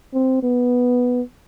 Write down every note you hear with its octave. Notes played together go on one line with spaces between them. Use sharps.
C4
B3